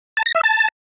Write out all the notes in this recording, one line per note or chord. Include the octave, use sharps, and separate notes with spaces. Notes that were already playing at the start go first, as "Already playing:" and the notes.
A5
A#6
E5
A5